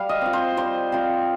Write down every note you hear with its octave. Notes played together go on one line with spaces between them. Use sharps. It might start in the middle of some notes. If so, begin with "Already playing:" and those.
Already playing: G3 F5
D#5
C4 F4
C5
G3 C5
C4 F4